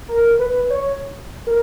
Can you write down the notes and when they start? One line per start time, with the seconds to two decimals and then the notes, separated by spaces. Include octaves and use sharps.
0.08 A#4
0.39 B4
0.70 C#5
1.47 A#4